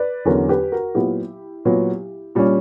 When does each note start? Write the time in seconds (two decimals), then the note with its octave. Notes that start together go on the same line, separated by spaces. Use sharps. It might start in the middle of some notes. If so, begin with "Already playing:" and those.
Already playing: B4 D5
0.25 E2 D3 F#3 C#4 A#4 C#5
0.49 G4 B4
0.72 F#4 A#4
0.95 A#2 F#3 B3 E4 G4
1.65 A#2 F#3 B3
2.35 A#2 G3 C#4